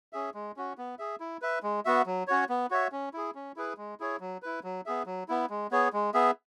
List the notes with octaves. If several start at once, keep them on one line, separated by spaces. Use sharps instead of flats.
C#4 G#4 E5
G#3
C#4 F#4
B3
G#4 E5
E4
B4 E5
G#3
B3 F#4 E5
F#3
C#4 F#4 C#5
B3
F#4 C#5 E5
C#4
E4 G#4
C#4
E4 G#4 B4
G#3
E4 G#4 C#5
F#3
E4 B4
F#3
B3 G#4 E5
F#3
B3 E4
G#3
B3 G#4 C#5
G#3
B3 G#4 E5